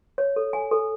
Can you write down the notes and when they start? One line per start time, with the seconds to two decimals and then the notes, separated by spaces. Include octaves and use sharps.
0.18 C#5
0.36 A4
0.53 G#5
0.71 A4